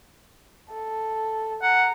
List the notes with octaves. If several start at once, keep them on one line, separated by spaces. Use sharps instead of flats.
A4
F#5 A#5